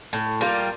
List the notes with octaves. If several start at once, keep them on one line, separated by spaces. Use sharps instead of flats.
A2
G3 A#3 F4